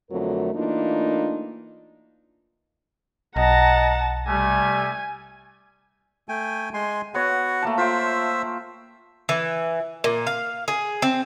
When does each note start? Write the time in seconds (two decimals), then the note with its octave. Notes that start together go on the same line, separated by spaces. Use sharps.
0.11 F2 D3 F#3 A3 F4 A#4
0.54 E3 A3 A#3 D4 D#4 F4
3.36 B1 D#5 F#5 A5 A#5
4.28 C3 G3 A3 G#5
6.29 A3 G5 G#5
6.74 G#3 G#5 C6
7.14 B3 F#4 C#5 F#5
7.62 A3 A#3 A5
7.78 F4 C5 E5 G5 E6
9.29 E3
10.04 A#2
10.27 F5
10.68 G#4
11.02 C4